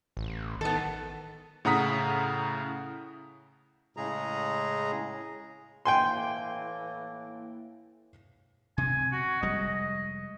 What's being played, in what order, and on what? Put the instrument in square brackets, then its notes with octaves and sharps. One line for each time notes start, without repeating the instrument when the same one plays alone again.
[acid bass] A1
[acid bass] D#3 [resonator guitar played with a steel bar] B3 A4
[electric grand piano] A2 C#3 F#5 A#5 D#6 B6
[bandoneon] A2 C#3 G#3 G#4 A#5
[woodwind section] A2 E3 A#3 [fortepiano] G5 G#5 C6
[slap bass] C3 C4 [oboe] G#5
[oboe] F#4
[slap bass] F1 G3 G#3 [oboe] D#5